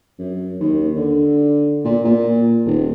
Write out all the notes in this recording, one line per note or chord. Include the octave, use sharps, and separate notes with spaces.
F#2
D#2
D3
A#2
A#2
D#1